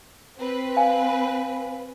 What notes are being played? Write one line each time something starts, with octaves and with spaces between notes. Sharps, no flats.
C4 B4
F5 G#5